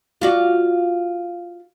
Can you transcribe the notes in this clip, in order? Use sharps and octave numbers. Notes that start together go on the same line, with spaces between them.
F4 F#4 D5